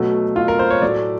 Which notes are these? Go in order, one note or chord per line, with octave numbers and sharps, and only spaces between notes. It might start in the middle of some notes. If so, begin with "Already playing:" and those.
Already playing: B2 F#3 A3
F4
A#4
C5
C#5
A2 F#3 A3 D5